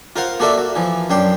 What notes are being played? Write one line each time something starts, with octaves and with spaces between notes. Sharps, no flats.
F4 A#4 C5 F5 F#5
A#3 F#4 A4 A#4 D5 E5
F#4
E3 F3
F#2 D4 G5 C6